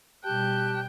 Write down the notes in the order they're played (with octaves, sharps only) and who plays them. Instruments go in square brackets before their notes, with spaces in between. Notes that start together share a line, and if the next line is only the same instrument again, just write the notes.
[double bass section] B2 G3 [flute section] G4 A5 F#6 [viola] G5